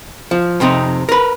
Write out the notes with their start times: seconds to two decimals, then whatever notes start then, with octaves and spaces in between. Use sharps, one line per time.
0.31 F3
0.60 F2 C3 C4 D#4
1.09 A#4 B4